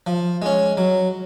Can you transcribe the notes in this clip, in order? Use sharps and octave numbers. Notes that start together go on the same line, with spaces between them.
F3
G#3 C#4
F#3